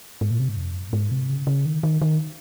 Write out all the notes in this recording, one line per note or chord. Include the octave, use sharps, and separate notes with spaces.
G#2
A#2
C3
G#2
F2
F#2
A#2
G#2
C3
C#3
C#3
D#3
D#3
D#3